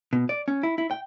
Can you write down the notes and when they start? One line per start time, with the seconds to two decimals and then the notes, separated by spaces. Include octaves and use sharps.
0.13 B2
0.29 D5
0.48 C#4
0.63 E4
0.78 E4
0.91 G5